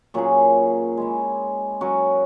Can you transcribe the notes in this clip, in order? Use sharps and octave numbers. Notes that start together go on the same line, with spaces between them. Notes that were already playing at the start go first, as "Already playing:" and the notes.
A#2 F#3 C#4 G#4
G#3 C#4 E4
F#3 C#4 F#4 A#4